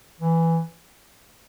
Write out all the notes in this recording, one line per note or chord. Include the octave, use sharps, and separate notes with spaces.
E3